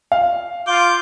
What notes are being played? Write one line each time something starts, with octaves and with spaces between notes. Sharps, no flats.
F5
F4 D6 G6